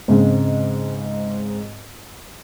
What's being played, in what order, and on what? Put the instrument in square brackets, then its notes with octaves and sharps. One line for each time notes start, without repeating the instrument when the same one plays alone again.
[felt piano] G#2 C#3 G#3 C4